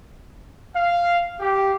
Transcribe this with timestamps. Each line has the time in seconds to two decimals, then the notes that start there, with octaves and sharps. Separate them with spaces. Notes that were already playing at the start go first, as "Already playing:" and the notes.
0.75 F5
1.40 G4